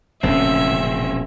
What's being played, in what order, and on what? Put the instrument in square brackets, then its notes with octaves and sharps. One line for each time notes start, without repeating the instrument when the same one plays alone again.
[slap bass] E1 A#1 [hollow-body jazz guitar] A2 C#3 [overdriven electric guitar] C4 C#4 [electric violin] E5